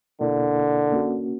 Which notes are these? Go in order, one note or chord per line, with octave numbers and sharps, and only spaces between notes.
B2 D3 A#3 E4 A#4 D5
A#3 C#4 F#4